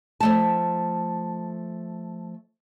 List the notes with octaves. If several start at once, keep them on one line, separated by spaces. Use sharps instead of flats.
F3 A3 A5